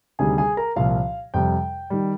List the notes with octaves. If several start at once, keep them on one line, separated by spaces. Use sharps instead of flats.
D2 C3 D#3 G3 G#4 G#5
G#4 G#5
A#4 A#5
C2 A#2 F3 F5
F2 C3 G3 G5
D#3 G3